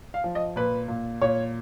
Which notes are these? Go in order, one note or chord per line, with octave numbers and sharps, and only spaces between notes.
F5
F3
D#5
A#2 B4
A#2
A#2 C#5